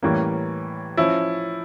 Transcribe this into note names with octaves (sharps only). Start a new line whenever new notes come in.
A2 E3 G3 A#3 C#4
F3 C#4 E4